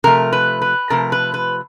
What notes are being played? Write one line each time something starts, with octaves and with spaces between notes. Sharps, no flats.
C3 F3 A3 A#4
B4
B4
C3 F3 A3 A#4
B4
B4